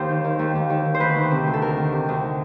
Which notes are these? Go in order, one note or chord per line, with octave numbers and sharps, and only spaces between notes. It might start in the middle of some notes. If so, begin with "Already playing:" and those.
Already playing: D#2 C5
D#3
D#3
D#2
D#2
D#3
D#3
C5
D2 B4
D#3
C3
D2
A4
D2 A#4
D#3
C3
D2